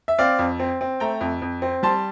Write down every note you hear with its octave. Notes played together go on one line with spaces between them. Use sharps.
E5
C4 D5 F5
F2
C4
C4
A3 G5 A#5
F2
F2
C4
G3 A5 C6